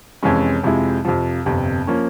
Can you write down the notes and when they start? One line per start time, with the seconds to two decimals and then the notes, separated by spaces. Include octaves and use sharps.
0.23 F2 C3 E3 G#3 C#4
0.63 F2 C3 F3 G#3 E4
1.05 F2 C3 F3
1.45 G1 F2 C3
1.87 F3 A#3 C#4